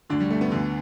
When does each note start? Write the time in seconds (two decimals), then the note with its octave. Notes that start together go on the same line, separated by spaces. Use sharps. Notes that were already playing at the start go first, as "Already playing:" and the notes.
0.10 D2 D3 D4
0.20 G3
0.30 A3
0.41 B3
0.52 D2 D3